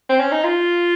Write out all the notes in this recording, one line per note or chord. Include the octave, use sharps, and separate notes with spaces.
C4
C#4
D#4
F4